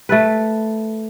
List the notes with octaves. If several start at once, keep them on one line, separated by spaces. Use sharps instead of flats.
A3 A4 B4